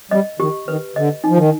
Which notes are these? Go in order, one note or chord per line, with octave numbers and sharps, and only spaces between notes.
G3 D#5
D#3 G4
D#3 B4
D3 D#5
D#4
F3
D#3